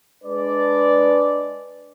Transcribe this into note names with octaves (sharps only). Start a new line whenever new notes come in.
G#3 D4 B4 D5